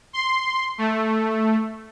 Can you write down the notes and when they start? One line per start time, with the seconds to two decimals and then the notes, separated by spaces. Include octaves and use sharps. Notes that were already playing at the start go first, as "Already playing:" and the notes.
0.13 C6
0.78 A3